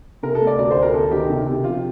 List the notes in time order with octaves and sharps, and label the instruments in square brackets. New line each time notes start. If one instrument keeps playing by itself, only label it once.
[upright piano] C3 A#4
A4
A3
D5
D2 D5
C5
D2
A#4
D2 A4
D#3 G4
C3
C3
F3 F4